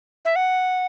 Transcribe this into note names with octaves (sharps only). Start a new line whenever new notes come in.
E5
F#5